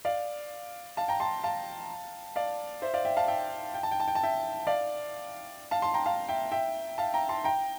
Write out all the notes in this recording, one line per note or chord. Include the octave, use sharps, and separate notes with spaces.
D5 F5
F5 A5
G5 A#5
A5 C6
F5 A5
D5 F5
C5 E5
D5 F5
E5 G5
F5 A5
E5 G5
G5
A5
G5
A5
G5
A5
E5 G5
D5 F5
F5 A5
A5 C6
G5 A#5
F5 A5
E5 G5
E5 G5
F5 A5
G5 A#5
A5 C6
G5 A#5